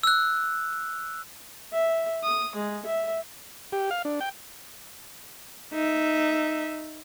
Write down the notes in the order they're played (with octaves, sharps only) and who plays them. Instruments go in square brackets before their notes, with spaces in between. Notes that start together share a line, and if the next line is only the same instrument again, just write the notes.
[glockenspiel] E6 F#6
[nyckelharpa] E5
D#6
G#3
E5
[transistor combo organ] G4
F5
D4
G5
[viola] D#4 E5